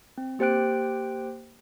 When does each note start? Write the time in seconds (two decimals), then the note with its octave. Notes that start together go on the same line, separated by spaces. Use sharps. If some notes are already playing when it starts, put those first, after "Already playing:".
0.18 C4
0.39 A#3 G4 C5 G5 F#6 D7